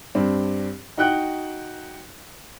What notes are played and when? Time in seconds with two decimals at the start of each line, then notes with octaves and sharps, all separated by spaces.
0.15 G2 C4 D4
0.97 D#4 F#4 F#5 G5 F#6